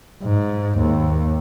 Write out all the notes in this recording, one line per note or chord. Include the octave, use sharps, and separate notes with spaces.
G#2
D#2